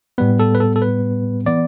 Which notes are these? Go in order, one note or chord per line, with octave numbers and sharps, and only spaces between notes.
A2 G3 B3 B4
A4
B4
A4
A4
B4
E3 B3 D5